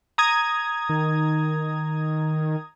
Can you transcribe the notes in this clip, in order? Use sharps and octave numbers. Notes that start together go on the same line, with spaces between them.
A#5 D#6 G#6
D#3